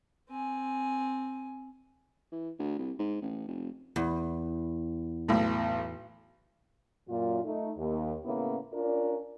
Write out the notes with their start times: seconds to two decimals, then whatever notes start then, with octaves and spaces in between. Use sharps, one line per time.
0.30 C4 G#5
2.32 E3
2.59 D2
2.79 C2
2.99 G#2
3.22 A1
3.48 F1
3.96 E2
5.28 B1 A2
7.08 F#2 A#2 F4
7.44 A3 D#4
7.77 D#2
8.25 A2 C#3 A#3 B3 C#4 E4
8.73 C#4 D4 F4 A#4 D5